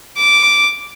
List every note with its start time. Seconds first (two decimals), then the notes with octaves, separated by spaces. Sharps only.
0.17 D6